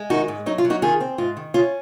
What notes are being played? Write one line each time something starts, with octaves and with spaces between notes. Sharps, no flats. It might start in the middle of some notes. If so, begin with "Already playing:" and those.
Already playing: G#3
D#3 D#4 F#4
G#2
F#3 D#4
F4
F#3
D#4 F#4
D#3 F4 G#4
C4
G#2 F4
D#3
C#4 F4